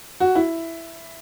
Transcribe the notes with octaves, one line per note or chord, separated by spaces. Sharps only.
F#4
E4